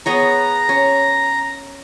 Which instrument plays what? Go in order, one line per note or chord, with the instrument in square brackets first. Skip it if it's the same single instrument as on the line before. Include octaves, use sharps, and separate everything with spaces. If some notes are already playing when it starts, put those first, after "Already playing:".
[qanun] B3 G#4 C#5 [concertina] A#5
[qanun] C#4